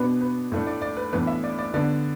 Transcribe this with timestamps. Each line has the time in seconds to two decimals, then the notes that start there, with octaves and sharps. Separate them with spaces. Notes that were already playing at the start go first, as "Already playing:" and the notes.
Already playing: B2 B3 D4 B4
0.21 B4
0.52 A2 A3 D4
0.67 D5
0.82 D5
0.97 B4
1.13 A2 E3 B3 D4 B4
1.27 E5
1.44 D5
1.59 D5
1.74 D3 B3 D4 D5